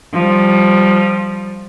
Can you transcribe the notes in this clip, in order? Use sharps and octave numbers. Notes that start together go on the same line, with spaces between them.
F3 G3